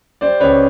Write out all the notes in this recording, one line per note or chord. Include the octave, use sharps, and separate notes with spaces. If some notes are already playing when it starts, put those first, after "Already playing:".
G3 C5 D5
C#2 B4 C#5